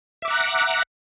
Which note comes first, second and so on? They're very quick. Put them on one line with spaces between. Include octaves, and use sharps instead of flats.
E5 D6 F#5 A#5 F#6